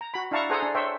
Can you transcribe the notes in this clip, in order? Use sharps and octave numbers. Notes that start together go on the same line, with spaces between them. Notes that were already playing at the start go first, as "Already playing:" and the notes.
A#5
F#4 B5
D4 E4 F5 A5 A#5 C#6
G#4 A4 C5 F#5 G#5 A#5
D4
C5 C#5 E5 G5